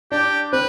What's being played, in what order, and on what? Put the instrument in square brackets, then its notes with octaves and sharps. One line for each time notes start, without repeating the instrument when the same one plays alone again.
[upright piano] D4 [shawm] G4
[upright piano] C4 [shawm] B4